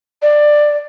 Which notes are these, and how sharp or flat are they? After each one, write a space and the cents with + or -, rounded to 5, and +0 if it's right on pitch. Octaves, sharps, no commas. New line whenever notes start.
D5 +15